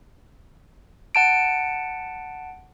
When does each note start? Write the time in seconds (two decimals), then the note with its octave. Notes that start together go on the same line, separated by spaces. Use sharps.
1.15 F#5 A5 D7